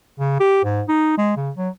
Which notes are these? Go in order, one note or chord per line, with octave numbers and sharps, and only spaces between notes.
C#3
G4
G#2
D#4
G#3
C#3
F#3